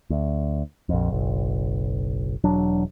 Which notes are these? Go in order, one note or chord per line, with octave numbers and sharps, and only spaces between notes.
D2
A#1 F2
F#1 B1
E1 F#3 D4